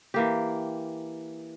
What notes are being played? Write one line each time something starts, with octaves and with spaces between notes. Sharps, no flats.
E3 A#3 G4